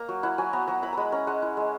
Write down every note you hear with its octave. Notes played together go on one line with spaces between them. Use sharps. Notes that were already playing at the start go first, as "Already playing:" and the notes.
Already playing: A#3 A#5
F#3
E4 F#5
F#3 G#5
B3 A#5
F#3 A#5
E4 B5
G#3 A#5 B5
C#4 A#5
G#3 F#5
E4
G#3